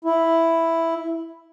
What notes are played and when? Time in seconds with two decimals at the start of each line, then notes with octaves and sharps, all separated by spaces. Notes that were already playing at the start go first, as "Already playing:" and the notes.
0.04 E4